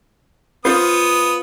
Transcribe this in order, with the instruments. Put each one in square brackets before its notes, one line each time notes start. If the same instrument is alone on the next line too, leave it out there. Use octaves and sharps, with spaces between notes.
[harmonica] B3 D#6 [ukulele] F4 C5